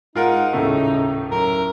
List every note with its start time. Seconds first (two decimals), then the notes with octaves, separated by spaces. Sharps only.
0.16 G#2 D#4 F4 A#4 F#5
0.53 D#1 A2 C#3 A3
1.31 F#2 A#4